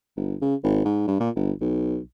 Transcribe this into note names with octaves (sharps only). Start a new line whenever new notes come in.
G1
C#3
G#1
G#2
G2
A#2
G1
B1